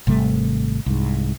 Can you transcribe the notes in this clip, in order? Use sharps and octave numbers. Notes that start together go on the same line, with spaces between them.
G#1 C3 G3 A3
C2 G#2